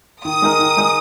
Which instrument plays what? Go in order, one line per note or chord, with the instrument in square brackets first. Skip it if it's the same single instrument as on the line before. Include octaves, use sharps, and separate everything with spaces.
[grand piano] D#3 [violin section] D#6
[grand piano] G#3 D#4 A#4
D#3
G#3 D#4 A#4